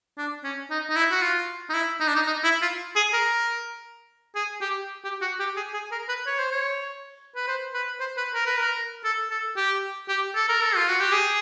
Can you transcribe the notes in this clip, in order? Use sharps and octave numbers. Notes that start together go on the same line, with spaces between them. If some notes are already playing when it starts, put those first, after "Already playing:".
D4
C#4
D#4
D#4
E4
F#4
F4
D#4
E4
D#4
D4
D#4
D#4
E4
F4
G#4
A#4
G#4
G4
G4
F#4
G4
G#4
G#4
A#4
B4
C#5
C5
C#5
B4
C5
B4
C5
B4
A#4
B4
A#4
A4
A4
G4
G4
A4
A#4
A4
F4
F#4
G4
G#4